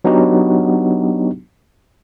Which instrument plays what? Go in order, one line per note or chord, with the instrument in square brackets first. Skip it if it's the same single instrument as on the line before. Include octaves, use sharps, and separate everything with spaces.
[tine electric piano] F#3 B3 D4 D#4 F#4 G4